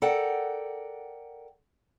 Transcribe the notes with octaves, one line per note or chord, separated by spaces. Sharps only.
A4 A#4 D5 F#5 G5